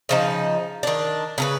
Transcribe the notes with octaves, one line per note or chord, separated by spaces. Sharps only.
C#3 F3 D#4
D#3 D4
C#3 A4 B4